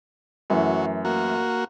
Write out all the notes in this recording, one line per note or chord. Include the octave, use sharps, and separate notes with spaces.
F#2 E3 F#3 A3
A#3 F#4